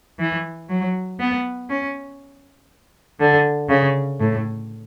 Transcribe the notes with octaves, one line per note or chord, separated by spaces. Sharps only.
E3
F#3
B3
C#4
D3
C#3
A2